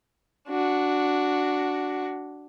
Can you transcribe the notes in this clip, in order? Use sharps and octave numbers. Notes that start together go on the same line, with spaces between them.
D4 F#4